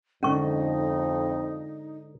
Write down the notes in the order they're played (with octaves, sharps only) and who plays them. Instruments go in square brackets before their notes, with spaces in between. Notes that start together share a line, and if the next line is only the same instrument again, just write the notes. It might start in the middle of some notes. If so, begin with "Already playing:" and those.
[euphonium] F2 [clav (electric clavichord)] G#2 D3 [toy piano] C#4 C#6 [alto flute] D#4